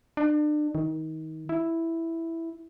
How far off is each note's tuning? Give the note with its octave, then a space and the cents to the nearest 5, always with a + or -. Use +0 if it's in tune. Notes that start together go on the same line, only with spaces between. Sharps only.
D4 +35
D#3 +25
E4 +0